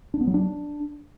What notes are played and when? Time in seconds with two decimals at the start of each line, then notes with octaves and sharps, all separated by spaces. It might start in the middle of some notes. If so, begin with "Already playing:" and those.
0.14 D4
0.21 B3
0.27 F#3
0.34 D4